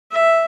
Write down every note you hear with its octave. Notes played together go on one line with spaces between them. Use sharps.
E5